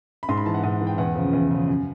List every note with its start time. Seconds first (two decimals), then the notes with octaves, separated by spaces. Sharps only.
0.23 B5
0.29 G#2 C6
0.37 B5
0.46 E3 A5
0.54 F#5
0.63 G#2
0.81 E3
0.87 G5
0.98 E2 F#5
1.15 C#3 F3
1.33 E2
1.50 C#3 F3
1.68 F#2